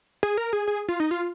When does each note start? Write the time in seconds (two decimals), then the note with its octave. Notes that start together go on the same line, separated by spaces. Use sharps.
0.23 G#4
0.37 A#4
0.53 G#4
0.67 G#4
0.88 F4
1.00 D#4
1.11 F4